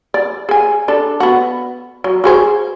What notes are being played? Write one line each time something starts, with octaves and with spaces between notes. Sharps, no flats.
D5
G#4 G#5
D4 A4 A5
B3 F#4
F#3
F#4 G#4 C5